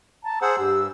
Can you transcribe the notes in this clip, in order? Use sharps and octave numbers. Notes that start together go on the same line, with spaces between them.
A5 A#5
G#4 C5 F#5 E6
G2 G4